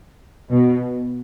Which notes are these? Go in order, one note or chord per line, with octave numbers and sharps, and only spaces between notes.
B2